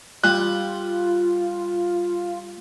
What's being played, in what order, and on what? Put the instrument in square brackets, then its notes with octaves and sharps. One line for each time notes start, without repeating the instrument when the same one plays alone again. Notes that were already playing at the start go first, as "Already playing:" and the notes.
[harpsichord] G3 [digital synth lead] F4 [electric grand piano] F#6